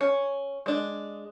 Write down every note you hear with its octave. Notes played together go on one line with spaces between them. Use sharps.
C#4
G#3 D4